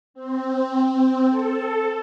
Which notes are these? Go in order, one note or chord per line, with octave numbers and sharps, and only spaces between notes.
C4
A4